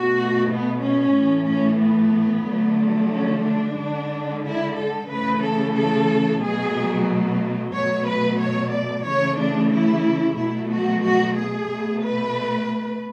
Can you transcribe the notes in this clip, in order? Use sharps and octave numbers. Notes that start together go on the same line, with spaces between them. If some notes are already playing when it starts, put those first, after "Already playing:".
Already playing: B2 A3 F#4
B3
C#4
A2 E3 A3
C#4
B3
D3 F#3 A3
C#4
D4
D3 G#3
E4
A4
C#3 E3 A3 B4
A4
A4
B2 F#3 A3 G#4
B2 F#3 A3 C#5
B4
C#5
D5
C#3 E3 A3 C#5
D4
E4
B2 F#3 A3 E4
F#4
F#4
G#4
B2 A3
B4